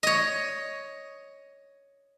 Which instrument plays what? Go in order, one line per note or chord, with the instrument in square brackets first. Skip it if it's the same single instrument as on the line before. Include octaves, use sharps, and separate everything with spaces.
[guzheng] C#5 D#5